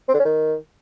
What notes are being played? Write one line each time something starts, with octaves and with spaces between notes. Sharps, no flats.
C4
D3
C#4
D#3